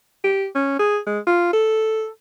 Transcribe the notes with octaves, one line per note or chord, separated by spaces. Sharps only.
G4
C#4
G#4
G#3
F4
A4